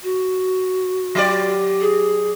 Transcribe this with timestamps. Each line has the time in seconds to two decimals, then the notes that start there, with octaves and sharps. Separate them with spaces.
0.03 F#4
1.15 F#3 G4 D5
1.81 G#4